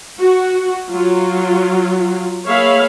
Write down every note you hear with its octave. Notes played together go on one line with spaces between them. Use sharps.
F#4
F#3 F4
A#3 G#4 C#5 E5 F5 B5